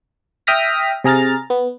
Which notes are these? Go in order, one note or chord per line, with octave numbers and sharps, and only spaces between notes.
E5 G5 D#6 F6 A#6 B6
C3 G#4 A#5 F6 A6
B3